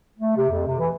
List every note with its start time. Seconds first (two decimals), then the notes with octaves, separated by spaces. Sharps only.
0.18 A3
0.37 C3
0.50 F2
0.66 C3
0.78 E3